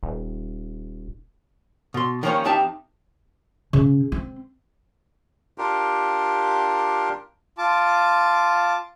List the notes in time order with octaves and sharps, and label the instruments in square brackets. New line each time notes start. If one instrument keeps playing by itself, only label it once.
[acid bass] D#1
[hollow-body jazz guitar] B2 C6
D#3 F3 G3 A#3 C#4 C#5
F2 C4 D#4 G4 E5 A5
[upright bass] C#3
C4
[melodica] D4 F4 G4 A#4
[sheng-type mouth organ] F4 A5 D6